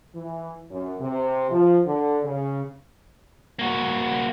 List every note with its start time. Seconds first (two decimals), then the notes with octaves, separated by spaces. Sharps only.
0.15 E3
0.70 F#2
1.00 C3
1.50 F3
1.85 D3
2.24 C#3
3.59 A#3 F#4